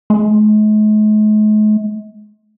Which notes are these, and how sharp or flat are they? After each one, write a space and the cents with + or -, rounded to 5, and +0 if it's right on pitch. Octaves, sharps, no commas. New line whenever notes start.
G#3 +45